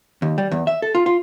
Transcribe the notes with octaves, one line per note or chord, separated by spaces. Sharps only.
D#2
G3
E2
E5
A4
F4
F4